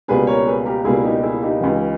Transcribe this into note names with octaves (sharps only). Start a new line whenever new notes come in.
C#2 B2 G3 A#3 G#4 B4
A#4 C#5
G#4 B4
G4 A#4
C#2 B2 G3 A#3 E4 G#4
D#4 G4
E4 G#4
D#4 G4
C#2 C#3 E3